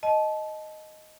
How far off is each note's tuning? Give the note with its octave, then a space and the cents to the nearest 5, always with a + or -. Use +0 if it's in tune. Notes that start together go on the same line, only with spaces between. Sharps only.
D#5 +0 A5 -25